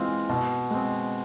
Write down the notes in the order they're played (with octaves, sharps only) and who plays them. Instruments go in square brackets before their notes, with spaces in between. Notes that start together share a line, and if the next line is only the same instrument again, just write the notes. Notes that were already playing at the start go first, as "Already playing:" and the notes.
Already playing: [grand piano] E3 G#3 C4 F4
B2
G#3 C4